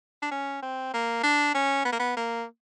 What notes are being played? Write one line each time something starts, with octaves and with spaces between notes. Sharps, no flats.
D4
C#4
C4
A#3
D4
C#4
B3
A#3
B3
A#3